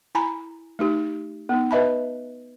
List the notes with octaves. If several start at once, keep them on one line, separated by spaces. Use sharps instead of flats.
E4 G#5 A#5 B5
A3 D#4 G4
B3 D#4
B4 D#5 E5 A5 B5